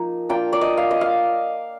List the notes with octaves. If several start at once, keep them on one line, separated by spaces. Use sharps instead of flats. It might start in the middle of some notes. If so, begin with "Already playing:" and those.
Already playing: F3 A#3 D#4
A#3 D4 F4 G5
D5
D#5
F5
D#5
F5